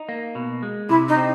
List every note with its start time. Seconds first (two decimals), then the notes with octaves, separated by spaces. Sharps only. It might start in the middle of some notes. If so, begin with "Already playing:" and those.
Already playing: D#4
0.09 A#3
0.35 B2
0.63 G#3
0.89 C3 E4
1.08 D#4
1.17 C4